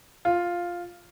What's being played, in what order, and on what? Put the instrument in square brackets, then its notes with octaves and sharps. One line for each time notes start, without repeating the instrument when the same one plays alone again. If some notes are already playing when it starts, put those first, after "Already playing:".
[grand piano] F4